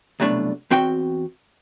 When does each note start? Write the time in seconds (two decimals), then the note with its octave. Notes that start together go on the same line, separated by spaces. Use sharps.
0.20 C2 F#2 B2 A3 D4
0.71 E2 C4 F#4 G5